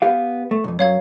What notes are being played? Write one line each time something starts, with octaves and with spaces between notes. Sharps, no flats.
B3 G4 F5
A3
B1 F2
F#2 F#3 C#5 F5 G#6